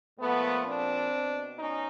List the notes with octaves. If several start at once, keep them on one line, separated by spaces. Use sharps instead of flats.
A#2 F3 A3 B3
C4 D4
B2
C#4 D#4